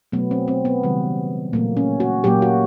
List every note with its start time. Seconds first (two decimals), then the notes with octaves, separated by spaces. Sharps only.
0.12 B2 F#3 A3 B3
0.31 C4
0.48 C4
0.65 B3
0.83 C#3 E3 G3
1.53 A#2 F#3 A3 A#3
1.77 C#4
2.00 F#4
2.24 A#2 F#3 A#3 G4
2.42 F#4